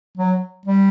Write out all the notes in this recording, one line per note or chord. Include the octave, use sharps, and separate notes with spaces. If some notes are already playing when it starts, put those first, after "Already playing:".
F#3
G3